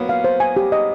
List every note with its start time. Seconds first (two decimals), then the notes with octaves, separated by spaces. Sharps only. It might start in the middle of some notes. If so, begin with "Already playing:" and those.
Already playing: F#3 A#3 B3
0.09 F5
0.24 C5
0.40 G#5
0.57 G4
0.72 D#5